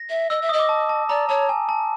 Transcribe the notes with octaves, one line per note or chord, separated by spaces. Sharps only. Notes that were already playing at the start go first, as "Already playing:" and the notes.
Already playing: A#6
E5
D#5 E6
E5
D#5 D#6
D6
A5
A5
D5 A#5
C#5 A5
G#5
A5